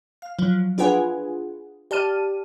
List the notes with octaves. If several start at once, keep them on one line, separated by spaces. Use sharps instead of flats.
F5
F3 F#3
D4 F4 G#4 B4 F#5 G#5
G4 D5 A5 F6 D#7